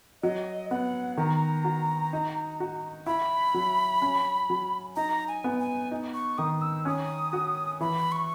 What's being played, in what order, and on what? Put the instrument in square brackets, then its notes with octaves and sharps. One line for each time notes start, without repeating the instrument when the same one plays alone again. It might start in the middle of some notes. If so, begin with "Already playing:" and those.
[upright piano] F#3 [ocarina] D#5
[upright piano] B3 [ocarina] F#5
[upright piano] D#3 [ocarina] A#5
[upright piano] F#4
D#4
F#4
[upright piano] E4 [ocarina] B5
[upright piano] F#3
C#4
F#3
[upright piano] D#4 [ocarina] A#5
[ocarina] G#5
[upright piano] B3
[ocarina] G#5
[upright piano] D#4
[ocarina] C#6
[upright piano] D#3 [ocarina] D#6
[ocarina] E6
[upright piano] C#4 [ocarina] D#6
[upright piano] F#4
[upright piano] E3 [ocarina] B5
[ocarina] C#6